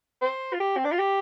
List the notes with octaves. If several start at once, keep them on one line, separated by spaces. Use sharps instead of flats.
C5
F4
G4
C4
D4
F4
G4